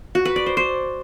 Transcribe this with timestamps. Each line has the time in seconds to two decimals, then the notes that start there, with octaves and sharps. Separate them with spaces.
0.15 F#4
0.25 B4
0.36 D5
0.46 C5
0.57 C5